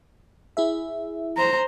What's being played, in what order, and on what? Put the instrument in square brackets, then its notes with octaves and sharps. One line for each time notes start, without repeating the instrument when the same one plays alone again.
[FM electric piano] E4 G#4 E5
[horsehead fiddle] C5 A#5